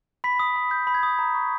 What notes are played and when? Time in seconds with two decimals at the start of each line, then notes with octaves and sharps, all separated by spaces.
0.24 B5 B6
0.39 D#6
0.56 B5
0.71 G6
0.87 B5
0.94 G#6
1.03 D#6
1.19 A#5
1.34 C#6